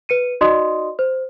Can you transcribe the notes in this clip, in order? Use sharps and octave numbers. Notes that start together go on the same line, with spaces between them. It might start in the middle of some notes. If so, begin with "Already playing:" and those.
B4 C#7 D#7
D#4 F#4 D5 D#5 C6 D#6
C5